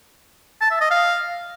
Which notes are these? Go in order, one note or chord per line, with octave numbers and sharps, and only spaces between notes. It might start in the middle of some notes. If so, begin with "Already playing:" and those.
A5
E5
D#5
F5